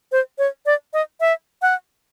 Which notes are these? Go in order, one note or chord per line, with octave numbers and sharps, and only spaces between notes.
C5
C#5
D5
D#5
E5
F#5